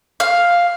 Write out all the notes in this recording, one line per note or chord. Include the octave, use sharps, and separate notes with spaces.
F5